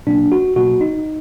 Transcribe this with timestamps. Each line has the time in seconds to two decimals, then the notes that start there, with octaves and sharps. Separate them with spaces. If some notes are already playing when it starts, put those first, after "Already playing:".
0.07 B2 F#3 A#3 D4
0.32 F#4
0.56 B2 F#3 A#3 F#4
0.81 D#4